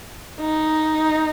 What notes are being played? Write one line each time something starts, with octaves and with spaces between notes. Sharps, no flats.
D#4